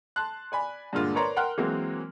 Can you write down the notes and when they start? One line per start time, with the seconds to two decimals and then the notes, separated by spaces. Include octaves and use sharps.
0.16 A5 C6 F#6
0.52 D5 G#5 B5
0.93 G2 A#2 D3 G#3 A#3 F4
1.15 A#4 B4 C#5 D5 A#5 C6
1.36 A#4 F#5 G5 C6 F6 F#6
1.58 E3 F#3 G#3 A#3 C4